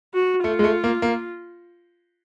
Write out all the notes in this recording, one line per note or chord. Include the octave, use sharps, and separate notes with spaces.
F#4
A3 F4
G#3
A3
A#3
A#3